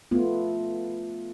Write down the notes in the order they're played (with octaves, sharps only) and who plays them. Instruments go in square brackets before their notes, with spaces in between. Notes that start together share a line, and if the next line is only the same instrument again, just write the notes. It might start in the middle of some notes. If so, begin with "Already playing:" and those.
[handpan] A3 B3 F4